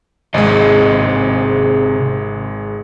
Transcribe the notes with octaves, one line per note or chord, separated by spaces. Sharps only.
G#1 C3 G#3 G#4 D#5